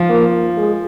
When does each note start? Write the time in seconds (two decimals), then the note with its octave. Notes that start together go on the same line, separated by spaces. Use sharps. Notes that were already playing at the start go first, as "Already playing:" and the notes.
Already playing: F3
0.10 A#3
0.57 G#3